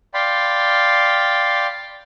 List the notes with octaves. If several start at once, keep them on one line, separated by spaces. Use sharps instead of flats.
D5 F5 G5 B5 C6